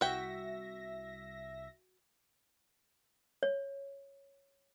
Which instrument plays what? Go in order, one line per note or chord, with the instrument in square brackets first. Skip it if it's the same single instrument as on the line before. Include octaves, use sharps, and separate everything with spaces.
[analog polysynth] C2 E5 A#6 [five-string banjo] F#4 G5
[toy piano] C#5